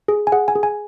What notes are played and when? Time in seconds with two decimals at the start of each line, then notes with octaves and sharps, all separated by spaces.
0.08 G#4
0.27 G#5
0.32 G#4 F#5
0.48 G#5
0.55 G#4
0.63 G#5